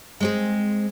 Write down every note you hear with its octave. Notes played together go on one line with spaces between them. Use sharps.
G#3 C4 G#4